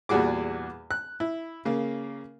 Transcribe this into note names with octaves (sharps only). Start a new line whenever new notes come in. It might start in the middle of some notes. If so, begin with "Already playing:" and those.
E2 A#2 G3 F#4 G#4 D6
F#6
E4
C#3 A#3